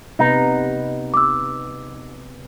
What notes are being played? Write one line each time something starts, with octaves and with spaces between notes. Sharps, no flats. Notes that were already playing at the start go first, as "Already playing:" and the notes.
C3 B3 D#4 B4
D6 E6